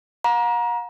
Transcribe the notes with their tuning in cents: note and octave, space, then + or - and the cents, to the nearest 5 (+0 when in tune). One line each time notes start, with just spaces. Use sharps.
F#5 -45 A#5 +30